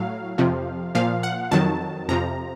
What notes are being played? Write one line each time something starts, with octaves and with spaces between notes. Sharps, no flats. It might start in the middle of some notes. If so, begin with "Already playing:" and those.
Already playing: A2 F#3 F5
F2 C3 F3
A#2 F3 F5
F#5
F2 D#3 F#3 A5
F2 C3 F3 A#5